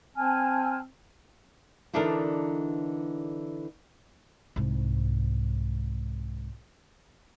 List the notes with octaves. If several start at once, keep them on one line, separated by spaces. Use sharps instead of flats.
C4 G#5 A5 F6
D3 E3 D4 D#4 A4 A#4
C2 G#2